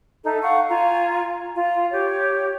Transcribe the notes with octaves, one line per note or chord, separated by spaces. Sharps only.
D#4 A4 E5
F5 F#5 C#6
F4 G#5 A#5
F4
G4 C#5